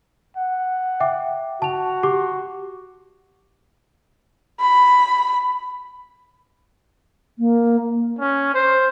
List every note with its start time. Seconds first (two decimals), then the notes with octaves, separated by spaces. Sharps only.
0.37 F#5
1.00 E5 G5 D6
1.62 F#4 A5 F7
2.03 G4 D6
4.61 B5
7.39 A#3
8.19 C#4
8.54 C5